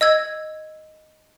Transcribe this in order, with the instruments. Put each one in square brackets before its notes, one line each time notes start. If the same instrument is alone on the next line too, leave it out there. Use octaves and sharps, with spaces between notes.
[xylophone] D#5 E6 G#6